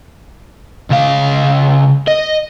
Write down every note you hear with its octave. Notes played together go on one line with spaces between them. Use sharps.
C#2 F5
D#5